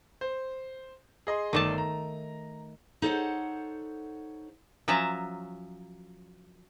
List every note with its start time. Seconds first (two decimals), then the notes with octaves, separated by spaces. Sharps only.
0.21 C5
1.27 G#4 D#5 C6
1.53 G1 D#3 A3 D5 A5 D6
1.78 A#5
3.02 D#4 A4 C5 C#5 F#5
4.88 F3 F#3 C#4 E5 A5 A#5